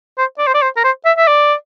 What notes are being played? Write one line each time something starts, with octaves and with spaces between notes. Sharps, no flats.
C5
D5
C5
D5
C5
A#4
C5
E5
E5
D5